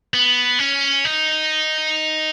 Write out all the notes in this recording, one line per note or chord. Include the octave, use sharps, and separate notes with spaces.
B3
C#4
D#4